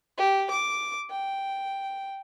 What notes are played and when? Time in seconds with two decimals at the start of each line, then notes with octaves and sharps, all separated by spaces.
0.18 G4
0.50 D6
1.10 G5